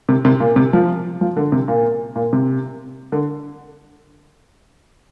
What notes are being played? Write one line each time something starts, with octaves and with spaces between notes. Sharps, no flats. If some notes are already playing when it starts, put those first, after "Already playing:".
C3
C3
A#2
C3
F3
F3
D3
C3
A#2
A#2
C3
D3